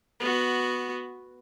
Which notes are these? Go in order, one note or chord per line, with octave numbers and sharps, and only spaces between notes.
B3 F#4